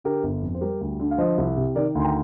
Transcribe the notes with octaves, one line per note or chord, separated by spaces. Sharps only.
D3 G4 A#4
G1
F2
C5
G3 G4 A#4
D2
D3
F5
F3 C5 D#5
C2
C3
D#3 A#4 D5
D2 C6
G5 A#5